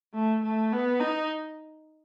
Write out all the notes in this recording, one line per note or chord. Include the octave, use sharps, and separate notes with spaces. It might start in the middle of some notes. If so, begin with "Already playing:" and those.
A3
A3
B3
D#4